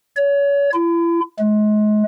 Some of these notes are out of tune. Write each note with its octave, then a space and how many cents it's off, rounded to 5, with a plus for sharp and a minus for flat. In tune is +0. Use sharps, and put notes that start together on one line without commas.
C#5 +30
E4 +40
G#3 +35